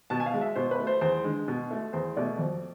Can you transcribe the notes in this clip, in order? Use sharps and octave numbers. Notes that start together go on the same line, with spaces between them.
B2 A5
G#5
F5
G#3
E5
B2 C5
B4
A3
C5
E2 C5
D3 G#3
B2
A3
E2 C5
B2 A3 D5
F2